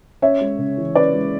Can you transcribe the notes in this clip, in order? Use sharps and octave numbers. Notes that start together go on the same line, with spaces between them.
C#4 C#5 E5
G#3
C#3
E3
C#4 B4 D5
G#3